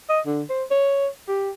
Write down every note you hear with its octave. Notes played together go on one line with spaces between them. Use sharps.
D#5
D3
C5
C#5
G4